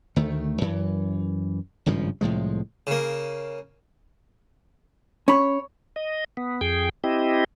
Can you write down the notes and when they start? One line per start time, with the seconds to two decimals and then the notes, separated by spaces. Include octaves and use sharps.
0.16 D2 D#3 A3
0.61 F#2 E3
1.86 G#1 G2 C#3 F3
2.21 C2 A2 F3 G#3
2.87 C#3 A#3
5.28 C#4 C#5 B5
5.96 D#5
6.37 B3
6.61 F2 G#4 G5
7.04 C4 E4 G4 D#5